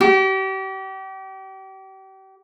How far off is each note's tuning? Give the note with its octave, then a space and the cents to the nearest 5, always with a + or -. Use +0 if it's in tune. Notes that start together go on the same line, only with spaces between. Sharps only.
G4 -35